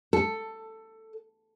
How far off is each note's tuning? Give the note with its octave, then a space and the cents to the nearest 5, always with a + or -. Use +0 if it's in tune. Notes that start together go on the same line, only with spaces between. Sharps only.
A4 +15